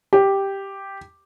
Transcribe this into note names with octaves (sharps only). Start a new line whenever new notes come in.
G4